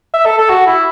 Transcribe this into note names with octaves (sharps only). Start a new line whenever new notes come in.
E5
A4
A4
F#4
E4